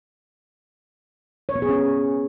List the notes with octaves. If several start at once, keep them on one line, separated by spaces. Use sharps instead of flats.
C#5
B3
G#4
C#4